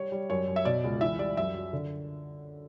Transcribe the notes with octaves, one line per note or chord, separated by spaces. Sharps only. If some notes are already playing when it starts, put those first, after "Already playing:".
Already playing: G3 C#5
G3
F#2 C#5
F#2
E5
B2 D5
C#2
E3 E5
G3 D5
F#2 E5
F#3
D3